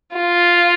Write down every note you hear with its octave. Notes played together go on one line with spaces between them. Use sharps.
F4